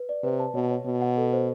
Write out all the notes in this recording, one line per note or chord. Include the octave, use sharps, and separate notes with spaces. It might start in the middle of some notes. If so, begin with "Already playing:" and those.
Already playing: B4
D5
C3 B4
A5
B2 C#5
C#5
B2 C#5
F#5
A4
C5